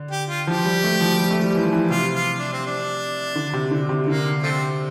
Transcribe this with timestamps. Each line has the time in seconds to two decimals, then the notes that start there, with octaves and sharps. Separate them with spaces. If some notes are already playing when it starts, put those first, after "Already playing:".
Already playing: D3
0.11 G4
0.29 F4
0.47 F3 G4
0.65 G3
0.84 A3
1.01 F3
1.19 G3
1.31 A3
1.42 G3
1.55 E3
1.63 F3
1.72 E3
1.90 C3 F4
2.15 F4
2.39 D4
2.53 C4
2.67 D4
3.36 D3
3.53 C3
3.71 D3
3.89 C3
4.07 D3 A#3
4.43 F3 A3 C4